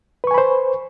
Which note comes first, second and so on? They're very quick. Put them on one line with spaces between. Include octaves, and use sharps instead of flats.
B4 C#6 G#5 B5 C5